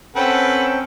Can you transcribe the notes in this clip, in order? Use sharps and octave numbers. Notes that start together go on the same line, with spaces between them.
C4 C#4 A4 B4 F#5 G5